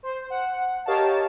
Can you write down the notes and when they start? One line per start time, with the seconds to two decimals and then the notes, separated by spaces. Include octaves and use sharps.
0.03 C5
0.30 F#5
0.86 G4 A#4 C#5 D#5 F5 A5